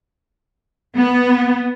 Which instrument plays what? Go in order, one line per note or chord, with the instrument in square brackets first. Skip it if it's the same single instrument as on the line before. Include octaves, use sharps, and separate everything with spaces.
[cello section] B3